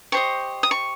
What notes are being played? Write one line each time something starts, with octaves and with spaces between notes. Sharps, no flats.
G4 C5 D#5 C#6
D#6
C#6